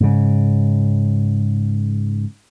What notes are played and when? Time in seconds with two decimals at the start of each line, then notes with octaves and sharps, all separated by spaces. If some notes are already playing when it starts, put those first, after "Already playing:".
0.01 G#2 C#3